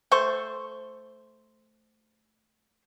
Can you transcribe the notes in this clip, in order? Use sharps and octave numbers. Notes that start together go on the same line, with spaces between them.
A3 C5 C#6